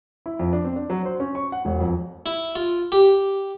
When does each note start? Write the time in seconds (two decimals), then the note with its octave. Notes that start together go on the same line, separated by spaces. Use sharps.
0.26 E4
0.39 F2
0.53 D4
0.64 C4
0.76 D4
0.90 F#3
1.05 C5
1.20 C#4
1.35 C#6
1.52 F#5
1.65 E1
1.80 F2
2.26 E4
2.56 F4
2.92 G4